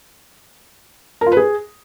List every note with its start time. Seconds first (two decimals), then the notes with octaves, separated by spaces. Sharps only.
1.21 A#4
1.26 F4
1.32 B4
1.37 G#4